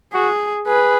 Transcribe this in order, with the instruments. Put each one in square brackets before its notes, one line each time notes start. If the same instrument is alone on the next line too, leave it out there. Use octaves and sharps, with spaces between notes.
[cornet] F#4 [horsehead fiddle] G#4
[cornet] G#4 [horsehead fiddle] B4